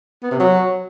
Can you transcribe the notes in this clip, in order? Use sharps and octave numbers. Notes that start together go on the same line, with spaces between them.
B3
C3
F#3